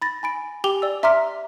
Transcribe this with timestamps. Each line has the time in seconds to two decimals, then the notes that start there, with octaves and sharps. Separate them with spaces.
0.02 B5 A6 A#6
0.23 G#5 B5 D7
0.64 G4 G5 G#5 D6 F7 G7
0.82 D5 E6
1.03 E5 A#5 C6 D6 F6 B6